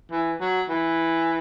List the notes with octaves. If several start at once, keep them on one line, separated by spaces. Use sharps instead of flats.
E3
F#3
E3